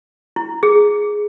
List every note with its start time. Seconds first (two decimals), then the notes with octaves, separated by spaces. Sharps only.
0.36 E4
0.63 G#4